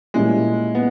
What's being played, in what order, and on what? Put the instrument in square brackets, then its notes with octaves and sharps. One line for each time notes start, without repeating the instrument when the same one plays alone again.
[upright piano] A#2 G3 C#4 E4 [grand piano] G#3
[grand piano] B3